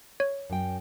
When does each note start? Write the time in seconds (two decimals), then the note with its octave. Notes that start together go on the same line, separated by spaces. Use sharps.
0.20 C#5
0.50 F#2 G5